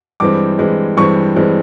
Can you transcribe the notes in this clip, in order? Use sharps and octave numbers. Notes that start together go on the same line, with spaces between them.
G2 E3 G#3 C4 D6
G2 E3 G#3 C4
G2 E3 G#3 C4 C#6
G2 E3 G#3 C4